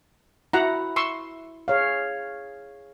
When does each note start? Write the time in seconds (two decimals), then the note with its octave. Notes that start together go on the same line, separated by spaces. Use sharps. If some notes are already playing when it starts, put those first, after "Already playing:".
0.53 E4 F#4 F#5 A#5
0.96 C6 C#6 E6
1.68 G#4 C#5 F5